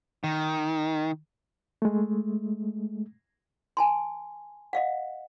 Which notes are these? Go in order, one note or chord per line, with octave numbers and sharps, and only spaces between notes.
D#3
G#3 A3
G#5 A5 C6
D#5 F5 F#5